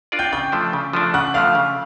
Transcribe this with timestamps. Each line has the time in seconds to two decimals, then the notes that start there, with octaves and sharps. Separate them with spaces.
0.12 D4 F4 A#4 D5
0.19 G5 G6
0.32 C#3 G5 G6
0.52 F3 A3 D4
0.73 C#3
0.93 F3 A3 D4
1.14 C#3 F#5 F#6
1.34 F3 A3 D4 F5 F6
1.55 C#3